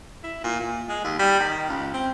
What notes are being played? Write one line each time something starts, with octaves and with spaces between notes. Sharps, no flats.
E4
A#2
A#2
G#3
D#2
G3
D#3
C#2
C4